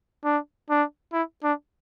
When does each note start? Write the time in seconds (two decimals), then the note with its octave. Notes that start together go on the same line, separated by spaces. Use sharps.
0.24 D4
0.70 D4
1.13 E4
1.44 D4